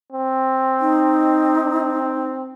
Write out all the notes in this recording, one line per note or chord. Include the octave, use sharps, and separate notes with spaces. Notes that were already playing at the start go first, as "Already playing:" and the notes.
C4
D#4